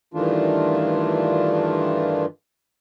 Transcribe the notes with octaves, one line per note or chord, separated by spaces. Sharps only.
G2 D#3 E3 A3 D4 F4